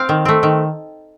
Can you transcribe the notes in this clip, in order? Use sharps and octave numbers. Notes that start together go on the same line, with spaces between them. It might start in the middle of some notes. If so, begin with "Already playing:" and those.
Already playing: C4 F5 G5
D#3
A3 C4
D#3